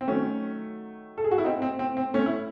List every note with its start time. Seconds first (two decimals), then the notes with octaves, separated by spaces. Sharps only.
0.01 C4
0.08 D#3 F#3 A3 C#4
1.18 A4
1.24 G#4
1.31 F#4
1.38 E4
1.44 C4 D#4
1.62 C4
1.79 C4
1.97 C4
2.14 A3 C#4
2.26 E4